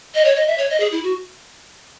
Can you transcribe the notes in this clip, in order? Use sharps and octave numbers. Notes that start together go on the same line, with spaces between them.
D#5
C#5
D#5
E5
C#5
D#5
G#4
E4
F#4